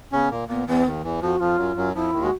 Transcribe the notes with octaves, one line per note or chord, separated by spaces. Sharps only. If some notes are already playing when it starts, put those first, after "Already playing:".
C#3 B3 C#4
A#2 A#3
A#2 A#3 B3
E2 E3 B3
D#2 D#3
E2 E3
F2 F3 F#4
F2 F3 F4
F#2 F#3
F#2 F#3
F2 F3 E4
D#2 D#3
G#3 F#4